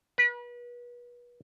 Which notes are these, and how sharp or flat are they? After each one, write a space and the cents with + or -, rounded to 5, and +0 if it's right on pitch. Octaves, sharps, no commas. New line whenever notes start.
B4 -35